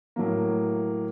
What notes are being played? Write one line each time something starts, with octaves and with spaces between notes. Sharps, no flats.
A2 F#3 A#3